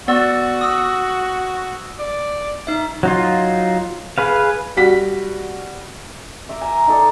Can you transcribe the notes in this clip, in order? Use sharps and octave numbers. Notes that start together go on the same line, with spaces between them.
B3 F#4 D5 E6
D#6 E6
D5
D#4 E5
F#3 D#4 F4
G#4 B4 F5
G3 F#4 B6
E5 A#5 D6
G#5 A#5
D#4 A4 D5